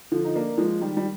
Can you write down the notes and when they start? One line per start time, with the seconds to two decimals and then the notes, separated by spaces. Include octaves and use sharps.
0.12 D3 F3
0.25 D#4
0.35 A#3 D4
0.58 F3 G#3
0.81 D#3 G3
0.97 G3